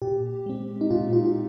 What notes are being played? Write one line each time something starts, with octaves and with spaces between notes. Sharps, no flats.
A#2 G4
G#3 C4
D#4
A#2 F4
F4
F4